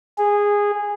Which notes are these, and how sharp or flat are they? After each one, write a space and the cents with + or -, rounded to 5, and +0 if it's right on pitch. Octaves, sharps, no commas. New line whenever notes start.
G#4 -15